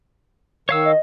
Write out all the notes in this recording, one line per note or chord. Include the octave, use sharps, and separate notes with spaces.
D#3 C#5 F5 E6
D#5